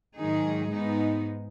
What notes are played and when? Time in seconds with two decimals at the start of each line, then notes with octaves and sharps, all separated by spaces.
0.17 G#2 D#3 F#3 D#4 G#4
0.71 G#2 G#3 B3 D#4